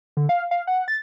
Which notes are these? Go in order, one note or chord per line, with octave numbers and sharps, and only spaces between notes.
D3
F5
F5
F#5
A6